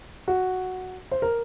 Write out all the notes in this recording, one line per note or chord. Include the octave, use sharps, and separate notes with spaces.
F#4
C5
A#4